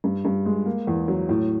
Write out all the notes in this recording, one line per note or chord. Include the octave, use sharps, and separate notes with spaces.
G2
G2
G#3
A#3
E2
F#3
A2